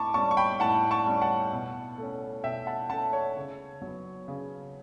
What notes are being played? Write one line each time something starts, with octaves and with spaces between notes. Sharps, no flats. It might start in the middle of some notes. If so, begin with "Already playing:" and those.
Already playing: A2 A5 B5 C#6 D6
G3 C#4 A5 C#6
C#6
G5 B5
A2 F#5 A5
A5 C#6
G3 C#4
F#5 A5
B2
A3 C#4
B2 E5 G5
F#5 A5
A3 C#4 F#5 A5
C#5
C#3
F#3
B3
C#3